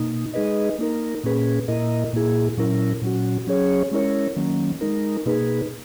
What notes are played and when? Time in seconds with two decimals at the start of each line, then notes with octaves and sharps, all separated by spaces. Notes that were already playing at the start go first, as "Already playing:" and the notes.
Already playing: B2 A#3 D#4
0.34 G#3 D#4 G#4 B4 D#5
0.78 A#3 D#4 A#4
1.24 A#2 A#3 C#4 G#4 B4
1.68 A#2 A#3 E4 A#4 D#5
2.13 A#2 A#3 E4 G#4
2.57 A#2 F#3 C#4 E4 A#4
3.02 A#2 F#3 C#4 F#4
3.47 F#3 C#4 G#4 C#5
3.91 G#3 C#4 E4 A#4 C#5
4.36 D#3 F#3 A#3 C#4
4.81 G#3 D#4 A#4
5.26 B2 A#3 D#4 G#4 B4